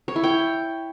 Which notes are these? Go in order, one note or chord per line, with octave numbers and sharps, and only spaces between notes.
C#5
E4
G5